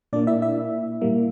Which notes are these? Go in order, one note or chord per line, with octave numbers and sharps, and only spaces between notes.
A#2 A#3 D4 D5
E4 E5
E4 E5
A#2 G3 A#3